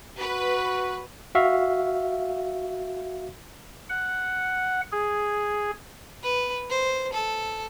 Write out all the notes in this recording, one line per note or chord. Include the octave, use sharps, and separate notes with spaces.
F#4 B4
F#4 E5 F5
F#5
G#4
B4
C5
A4